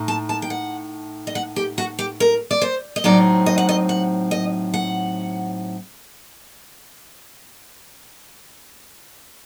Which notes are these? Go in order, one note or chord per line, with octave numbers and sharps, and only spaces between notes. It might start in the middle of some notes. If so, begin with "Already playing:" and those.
Already playing: A2 A3 D#4
A5
A5
G5
F#5
D#5
F#5
G4
F#4
G4
A#4
D5
C5
D#5
A2 F#3 C4 D#4 D5
D#5
F#5
D#5
F#5
D#5
F#5